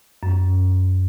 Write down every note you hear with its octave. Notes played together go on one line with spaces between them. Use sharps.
F#2